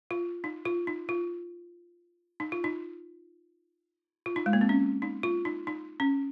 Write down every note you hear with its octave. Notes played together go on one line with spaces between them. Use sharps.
F4
D#4
F4
D#4
F4
D#4
F4
D#4
F4
D#4
G#3
A#3
C4
C#4
D#4
F4
D#4
D#4
C#4